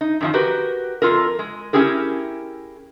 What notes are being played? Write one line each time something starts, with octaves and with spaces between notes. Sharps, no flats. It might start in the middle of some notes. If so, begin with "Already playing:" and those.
D#4
F#2 D#3 F3
F#4 G4 A#4 B4
F2 D#3 F4 A4 A#4
G#3
C#4 E4 G4 G#4 A#4